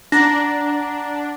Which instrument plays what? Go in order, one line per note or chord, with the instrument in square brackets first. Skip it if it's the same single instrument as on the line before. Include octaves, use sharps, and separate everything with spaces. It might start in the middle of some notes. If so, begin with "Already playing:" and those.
[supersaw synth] D4 [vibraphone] F#5 A#5 [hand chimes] A#6